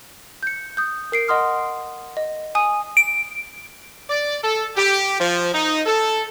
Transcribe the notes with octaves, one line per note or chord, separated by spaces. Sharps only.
G6 C#7
D#6 G6
A#4 C7 D7
D#5 F#5 C6 D#6 F6
D#5
G#5 D#6 D#7
D7
D5
A4
G4
F3
D#4
A4